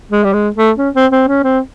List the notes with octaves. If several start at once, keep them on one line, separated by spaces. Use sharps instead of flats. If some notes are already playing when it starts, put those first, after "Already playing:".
G#3
G3
G#3
A3
C#4
C4
C4
C#4
C4